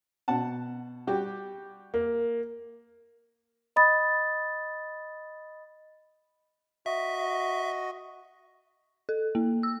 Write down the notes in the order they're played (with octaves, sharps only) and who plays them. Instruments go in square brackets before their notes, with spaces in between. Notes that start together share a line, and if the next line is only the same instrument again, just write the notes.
[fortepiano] B2 F#5 A5
G3 F#4 G4
[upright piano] A#3
[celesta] D#5 B5 D#6 A6
[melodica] F#4 D#5 [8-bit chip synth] E5
[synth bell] A4
A#3
E6